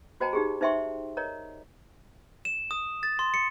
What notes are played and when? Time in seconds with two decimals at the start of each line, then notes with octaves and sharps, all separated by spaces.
0.20 F#4 C5 D#5 G5 A5 A#5
0.33 D#4 G4 G#4
0.61 D#4 C5 E5 G5 C6 C#6
1.17 A#4 C#5 D#5 A#5
2.45 E7
2.71 D#6
3.03 A6
3.19 C6
3.34 C#7